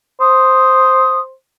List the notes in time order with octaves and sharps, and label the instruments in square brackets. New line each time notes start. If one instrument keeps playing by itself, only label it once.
[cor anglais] C5 [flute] D#6